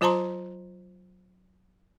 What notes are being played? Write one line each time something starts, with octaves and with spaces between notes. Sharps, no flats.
F#3 F4 C5 A5 A#5 C6